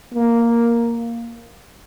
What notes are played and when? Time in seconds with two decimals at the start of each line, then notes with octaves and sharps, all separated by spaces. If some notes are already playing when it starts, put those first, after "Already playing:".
0.14 A#3